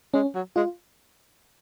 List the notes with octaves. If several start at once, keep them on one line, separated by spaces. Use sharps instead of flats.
G#3 C#4
F#3
G#3 F4